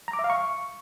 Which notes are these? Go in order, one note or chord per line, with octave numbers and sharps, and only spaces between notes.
A#5
D6
E5
F5
C#6